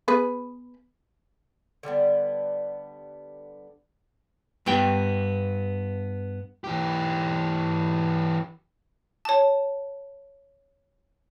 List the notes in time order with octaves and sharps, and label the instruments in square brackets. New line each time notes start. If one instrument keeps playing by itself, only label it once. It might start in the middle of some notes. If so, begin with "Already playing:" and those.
[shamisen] B3 G#4 B4
[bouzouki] D3 G3 A3 B3
[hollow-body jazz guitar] G2 B3 G5
[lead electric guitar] E3 G4
[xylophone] C#5 A5